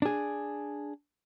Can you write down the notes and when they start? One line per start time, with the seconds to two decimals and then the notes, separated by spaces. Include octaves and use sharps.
0.02 D4 G#4